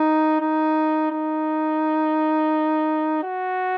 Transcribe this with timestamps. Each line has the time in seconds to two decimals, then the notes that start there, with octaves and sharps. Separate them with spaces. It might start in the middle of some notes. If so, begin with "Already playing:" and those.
Already playing: D#4
0.41 D#4
1.11 D#4
3.23 F#4